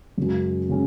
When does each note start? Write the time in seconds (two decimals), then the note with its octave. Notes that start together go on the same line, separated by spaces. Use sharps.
0.18 F#2 C#3 G#3 C#4 F#4
0.69 C#3 G#3 C#4